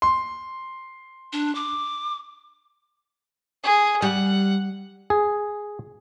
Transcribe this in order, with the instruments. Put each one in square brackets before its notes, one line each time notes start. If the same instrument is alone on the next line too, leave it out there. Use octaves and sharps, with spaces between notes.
[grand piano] C6
[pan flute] D4
D6
[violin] G#4
[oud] G3 [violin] F#5
[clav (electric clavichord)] G#4